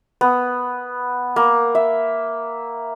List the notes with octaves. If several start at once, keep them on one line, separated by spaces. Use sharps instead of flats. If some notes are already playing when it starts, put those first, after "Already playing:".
B3
A#3
E5